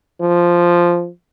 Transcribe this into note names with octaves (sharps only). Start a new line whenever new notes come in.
F3